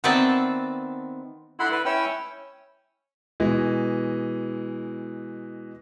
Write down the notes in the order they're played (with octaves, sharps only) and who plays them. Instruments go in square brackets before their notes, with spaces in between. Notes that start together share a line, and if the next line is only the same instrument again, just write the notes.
[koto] D#3 B3 C4 D5 E5 A5
[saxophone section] D3 E4 [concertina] F#5 B5 C6
[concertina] B4
[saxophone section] C#4 [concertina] E4 G5 E6
[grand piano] B2 E3 G#3